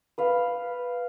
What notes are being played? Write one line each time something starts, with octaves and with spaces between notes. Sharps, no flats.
B4 F5